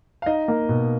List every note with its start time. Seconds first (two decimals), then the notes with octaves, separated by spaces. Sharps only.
0.22 F5
0.26 D#4 D#5
0.48 A#3
0.69 B2